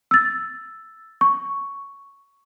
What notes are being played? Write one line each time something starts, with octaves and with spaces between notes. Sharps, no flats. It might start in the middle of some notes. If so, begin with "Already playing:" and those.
E6 A6
C#6